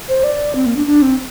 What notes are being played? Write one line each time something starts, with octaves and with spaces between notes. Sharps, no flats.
C5
D5
C4
A#3
D4
D4
C4